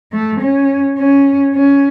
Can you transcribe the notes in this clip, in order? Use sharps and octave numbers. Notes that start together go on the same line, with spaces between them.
A3
C#4
C#4
C#4